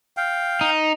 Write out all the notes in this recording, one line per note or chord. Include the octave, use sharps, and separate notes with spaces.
F5 G5
D#4